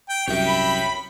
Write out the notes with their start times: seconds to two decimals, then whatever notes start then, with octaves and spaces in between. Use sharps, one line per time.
0.09 G5
0.28 C2 F#2 C#5 E5 G5
0.47 B5